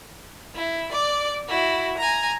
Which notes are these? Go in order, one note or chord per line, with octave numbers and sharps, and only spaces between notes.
E4
D5 D6
E4 F#4
G#5 A#5